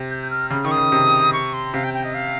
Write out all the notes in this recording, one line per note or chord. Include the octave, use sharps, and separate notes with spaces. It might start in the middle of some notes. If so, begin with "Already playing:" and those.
Already playing: C3
G6
G6
F6
C#3 F6
D#3 C#6
D#6
C#3
C3
C#6
C6
C3 F5
G5
G5
D#5
F5